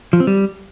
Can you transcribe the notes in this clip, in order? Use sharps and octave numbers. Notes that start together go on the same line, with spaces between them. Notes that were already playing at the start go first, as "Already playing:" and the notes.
F3
C4
G3